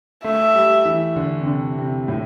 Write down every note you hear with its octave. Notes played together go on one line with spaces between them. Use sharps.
A3 E5
G3
E3
D3
C3
D3
C3
A2